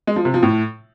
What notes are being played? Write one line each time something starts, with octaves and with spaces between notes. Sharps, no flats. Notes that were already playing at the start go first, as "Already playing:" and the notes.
G#3
F3
C3
F3
A2